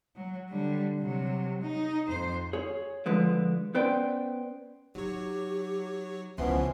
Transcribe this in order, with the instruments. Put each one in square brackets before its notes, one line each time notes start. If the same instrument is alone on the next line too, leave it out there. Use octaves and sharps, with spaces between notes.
[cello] F#3
D3 G3
C3 F#3
D#4
F2 C5
[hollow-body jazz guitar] G#4 C#5
D3 F3 G#3 B4
B3 C#4 B4 C5 D5 G5
[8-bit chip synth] F#3 C#5 [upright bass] D#4 [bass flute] G4
[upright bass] C#2 [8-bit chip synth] B2 E3 C6 [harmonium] F3 B3 C#4 [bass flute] E5